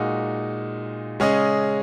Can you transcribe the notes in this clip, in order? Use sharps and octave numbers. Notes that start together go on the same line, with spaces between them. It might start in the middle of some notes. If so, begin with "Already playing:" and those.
Already playing: A#2 G#3 D#4 F#4
C#3 G#3 C#4 G#4 D#5